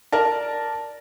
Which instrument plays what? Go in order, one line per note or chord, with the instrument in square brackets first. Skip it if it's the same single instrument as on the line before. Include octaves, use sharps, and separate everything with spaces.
[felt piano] A#4 D5 A5